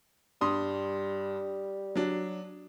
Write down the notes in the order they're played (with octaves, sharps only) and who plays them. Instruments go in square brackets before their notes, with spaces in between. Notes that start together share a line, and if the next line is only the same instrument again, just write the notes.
[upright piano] G2 C6 D#6 [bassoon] G3
[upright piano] F#3 D4